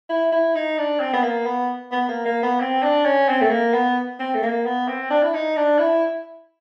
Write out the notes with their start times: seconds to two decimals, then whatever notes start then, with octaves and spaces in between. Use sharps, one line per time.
0.09 E4
0.32 E4
0.55 D#4
0.78 D4
1.00 C4
1.13 B3
1.23 A#3
1.45 B3
1.92 B3
2.09 A#3
2.25 A#3
2.43 B3
2.60 C4
2.83 D4
3.05 C#4
3.28 C4
3.41 A3
3.51 A#3
3.74 B3
4.20 C4
4.34 A3
4.43 A#3
4.65 B3
4.88 C4
5.10 D4
5.23 E4
5.34 D#4
5.56 D4
5.79 E4